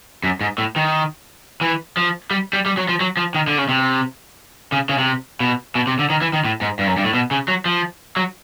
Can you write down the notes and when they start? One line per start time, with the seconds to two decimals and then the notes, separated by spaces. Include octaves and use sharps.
0.24 F#2
0.41 G#2
0.58 A2
0.76 D#3
1.61 E3
1.97 F3
2.31 G3
2.53 G3
2.66 G3
2.77 F#3
2.89 F3
3.00 F#3
3.17 F3
3.35 D#3
3.47 D3
3.58 C#3
3.69 C3
4.72 C#3
4.89 C#3
4.98 C3
5.40 B2
5.75 B2
5.87 C3
5.99 D3
6.10 D#3
6.21 E3
6.33 D#3
6.45 A2
6.61 G#2
6.79 G2
6.87 F#2
6.97 G2
7.05 A2
7.14 B2
7.31 C#3
7.48 F#3
7.65 F3
8.17 F#3